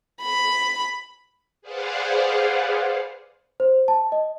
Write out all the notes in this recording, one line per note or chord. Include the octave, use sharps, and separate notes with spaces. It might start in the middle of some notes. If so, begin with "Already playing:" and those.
B5
G#4 B4 C5 D5 F5 F#5
C5
A5
D#5